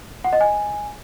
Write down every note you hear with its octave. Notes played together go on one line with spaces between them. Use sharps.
F#5
D#5
G#5